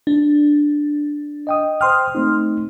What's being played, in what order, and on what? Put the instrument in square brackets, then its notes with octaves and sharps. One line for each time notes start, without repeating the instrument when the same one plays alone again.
[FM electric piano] D4
[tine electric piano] D#5 G5 D#6
[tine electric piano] C5 G5 [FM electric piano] C6 D#6 F6
[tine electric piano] A3 C4 D#4